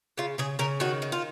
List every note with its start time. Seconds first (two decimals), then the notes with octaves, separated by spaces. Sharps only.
0.18 C#3 F4
0.38 C#3 G#4
0.59 C#3 A#4
0.80 D#3 F#4
1.02 D#3
1.12 F4